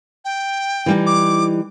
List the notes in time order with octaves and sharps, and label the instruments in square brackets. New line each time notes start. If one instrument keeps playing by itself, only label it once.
[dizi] G5
[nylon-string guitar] E3 G3 D#4
[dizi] D6